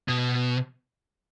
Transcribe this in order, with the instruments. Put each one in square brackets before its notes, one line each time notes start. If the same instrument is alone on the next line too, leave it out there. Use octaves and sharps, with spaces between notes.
[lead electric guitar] B2